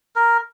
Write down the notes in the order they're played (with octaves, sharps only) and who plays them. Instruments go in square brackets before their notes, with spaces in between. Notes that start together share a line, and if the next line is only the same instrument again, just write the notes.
[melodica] A#4